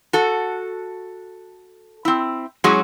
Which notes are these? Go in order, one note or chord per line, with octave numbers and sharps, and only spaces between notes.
F#4 A4
C4 E4
F#3 G#3 C#4 E4 F#4 G#4